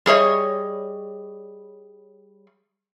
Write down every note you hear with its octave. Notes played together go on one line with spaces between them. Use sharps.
G3 G#4 C#5 D#5